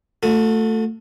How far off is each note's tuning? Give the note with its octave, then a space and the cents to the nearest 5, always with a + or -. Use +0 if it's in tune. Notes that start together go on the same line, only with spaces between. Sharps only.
A3 +10 F#4 -40